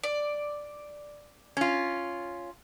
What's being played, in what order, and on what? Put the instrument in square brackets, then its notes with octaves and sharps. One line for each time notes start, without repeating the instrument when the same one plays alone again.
[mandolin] D5
[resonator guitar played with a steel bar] C#4 F4